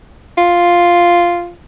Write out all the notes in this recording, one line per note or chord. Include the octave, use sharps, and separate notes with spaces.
F4